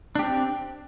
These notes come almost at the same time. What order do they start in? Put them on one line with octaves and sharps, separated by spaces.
D4 G4 C4